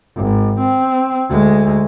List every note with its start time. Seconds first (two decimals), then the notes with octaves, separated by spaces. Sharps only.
0.16 G#1
0.60 C4
1.29 D2 G#3